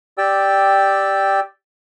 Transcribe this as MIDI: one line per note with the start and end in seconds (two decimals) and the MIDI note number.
0.18 1.40 67
0.18 1.40 74
0.18 1.40 79
0.18 1.40 88